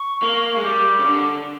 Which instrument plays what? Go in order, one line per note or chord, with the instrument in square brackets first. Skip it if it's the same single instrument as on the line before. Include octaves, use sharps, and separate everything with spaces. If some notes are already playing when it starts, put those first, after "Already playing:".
Already playing: [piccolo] C#6
[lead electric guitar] A#3
G#3
[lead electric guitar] G3 [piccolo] D6
[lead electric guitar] C#3
D3